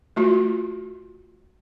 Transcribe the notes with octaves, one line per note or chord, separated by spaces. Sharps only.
A3 F4 F#4